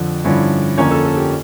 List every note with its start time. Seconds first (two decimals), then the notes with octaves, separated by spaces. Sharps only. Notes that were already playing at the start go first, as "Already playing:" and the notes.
Already playing: F2 D3 F3
0.24 G2 D3 F3 C#4 E4
0.78 F2 D3 F3 A#3 C#4 C#5
0.90 A4
1.04 A4
1.17 G4